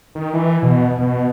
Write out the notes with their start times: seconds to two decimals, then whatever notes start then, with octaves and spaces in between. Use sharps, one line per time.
0.15 D#3
0.34 E3
0.63 B2
0.99 B2